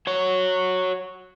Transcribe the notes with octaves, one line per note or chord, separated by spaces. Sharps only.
F#4 C#5